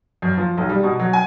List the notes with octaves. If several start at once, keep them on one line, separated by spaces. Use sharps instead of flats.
F#2
F3
B1
G3
B2
F#3
G#5